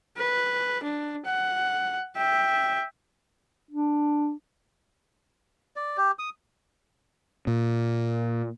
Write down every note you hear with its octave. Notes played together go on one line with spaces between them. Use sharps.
B4
D4
F#5
E5 G5
D4
D5
G4
D#6
A#2